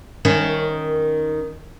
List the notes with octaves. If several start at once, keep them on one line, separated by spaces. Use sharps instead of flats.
D#3 C#4